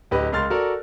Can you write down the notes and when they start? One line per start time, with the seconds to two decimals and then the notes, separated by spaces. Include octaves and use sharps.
0.11 D1 G4 B4 D#5
0.32 C#2 A#4 C6 F6 A6
0.50 F#4 A4 A#4 D5